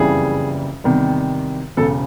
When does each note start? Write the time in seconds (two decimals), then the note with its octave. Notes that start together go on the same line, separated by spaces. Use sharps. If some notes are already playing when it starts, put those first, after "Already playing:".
Already playing: F#1 F2 C#3 E3 G3 G#4
0.84 E2 C3 D#3 G3
1.77 E1 E2 C#3 A4